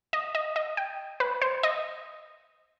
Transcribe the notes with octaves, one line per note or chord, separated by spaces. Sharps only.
D#5
D#5
D#5
G5
B4
C5
D#5